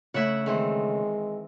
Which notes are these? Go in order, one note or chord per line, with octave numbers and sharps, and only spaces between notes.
C#3 A3 E4 E5 F#5
D#3 E3 G#3 C4